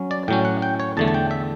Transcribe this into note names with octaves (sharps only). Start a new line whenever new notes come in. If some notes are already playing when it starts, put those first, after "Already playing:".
Already playing: F#3 C#4
D5
A2 F#3 C#4 G5
F#5
G5
C#5
E2 D3 A3 A5
A5
G5
E5